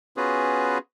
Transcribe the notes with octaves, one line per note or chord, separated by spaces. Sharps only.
B3 C#4 F4 F#4 G#4 B4